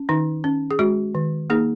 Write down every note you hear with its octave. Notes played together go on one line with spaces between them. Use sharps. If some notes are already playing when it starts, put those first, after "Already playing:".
Already playing: C#4
D#3 D#4
C#4
G#4
G#3 F#4
D#3
A#3 D#4 G#4